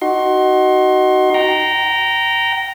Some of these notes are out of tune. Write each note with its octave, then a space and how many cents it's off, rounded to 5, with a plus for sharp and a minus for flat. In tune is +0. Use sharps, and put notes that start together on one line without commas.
D#4 -5 F#4 +20 C6 +25
G5 -25 A#5 +0